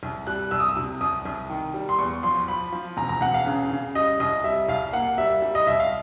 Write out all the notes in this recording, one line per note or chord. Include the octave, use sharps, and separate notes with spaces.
C2
G3 F#6
C2 E6
D#6
E6
C3
C2 D#6
C2
D#3
G3
C6
E2 C#6
F3 C6
F3 B5
F3
E1 A#5
A#5
E1 F#5
F5
C#3
C#3
G3 D#5
C2 D#5
G3 E5
C2 F5
A#3 F#5
G3 E5
G3
D#5
C2 E5
F5